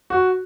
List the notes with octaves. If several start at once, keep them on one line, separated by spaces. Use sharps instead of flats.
F#4